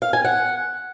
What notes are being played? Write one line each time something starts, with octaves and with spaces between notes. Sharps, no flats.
F5
G#5
F#5